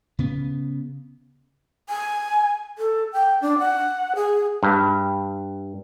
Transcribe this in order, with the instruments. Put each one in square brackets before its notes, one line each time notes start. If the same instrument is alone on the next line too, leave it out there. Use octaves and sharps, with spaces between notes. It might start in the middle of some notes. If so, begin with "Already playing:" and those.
[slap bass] C#3 B3
[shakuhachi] G#5
A4
G5
D4
F#5
G#4
[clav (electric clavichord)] G2